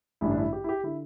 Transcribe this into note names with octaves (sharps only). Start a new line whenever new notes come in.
A1 G2 D3 E4
D4
E4
G4
E4
G4
D3 E4